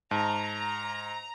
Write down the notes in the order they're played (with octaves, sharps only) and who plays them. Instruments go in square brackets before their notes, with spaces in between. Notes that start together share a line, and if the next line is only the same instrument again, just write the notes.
[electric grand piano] G#2 [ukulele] A5 [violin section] A#5